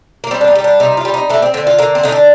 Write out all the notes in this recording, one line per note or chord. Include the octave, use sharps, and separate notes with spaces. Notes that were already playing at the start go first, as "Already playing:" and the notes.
A#3
G3 C4
D4
D#4
G3
D4
C3 D#4
F4
G3
D#4
A3 D4
C4
D3 C4
F4
D3 A#3
C4
D3 D#4
D4